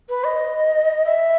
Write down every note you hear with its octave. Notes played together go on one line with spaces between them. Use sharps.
B4
D#5
E5